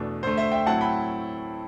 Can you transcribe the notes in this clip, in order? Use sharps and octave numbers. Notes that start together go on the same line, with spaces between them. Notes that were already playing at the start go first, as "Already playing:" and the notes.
Already playing: E2 B2 A3 D4
D2 D3 A3 C5
C5 E5
E5 G5
A2 F#3 C4 E4 F#5 A5
G5 B5